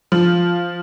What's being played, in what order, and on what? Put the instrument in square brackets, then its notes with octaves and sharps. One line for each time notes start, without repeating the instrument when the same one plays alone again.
[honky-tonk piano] F3